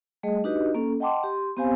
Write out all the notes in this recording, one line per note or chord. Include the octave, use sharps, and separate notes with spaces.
G3 A3 G#4 D#5
D4 D#4 F#4 G4 B4 D#5
A#3 C#4 A4
D#5 F#5 G5 A5 C6 D6
G4 C6
B3 C4 G4 C5 F5 G#5